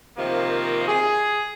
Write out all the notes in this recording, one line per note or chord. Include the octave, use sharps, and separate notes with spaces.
C3 D#3 F3 A#3
G#4